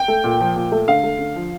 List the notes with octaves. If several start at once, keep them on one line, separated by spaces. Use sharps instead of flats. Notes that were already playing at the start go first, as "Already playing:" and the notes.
Already playing: G5
A3
A#2
F3
A#2
A3
D3 F5
A3
D3
F3